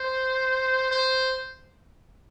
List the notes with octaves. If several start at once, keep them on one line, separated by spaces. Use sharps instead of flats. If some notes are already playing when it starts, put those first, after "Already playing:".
Already playing: C5
C5